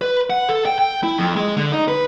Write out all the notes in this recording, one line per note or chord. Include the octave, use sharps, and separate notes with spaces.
B4
F#5
A4
G5
G5
E4
F2
G#3
D3
D#4
B4